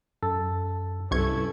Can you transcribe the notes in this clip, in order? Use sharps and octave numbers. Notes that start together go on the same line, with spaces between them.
F#2 A4
C2 G2 C#4 E4 A4 C#6 G#6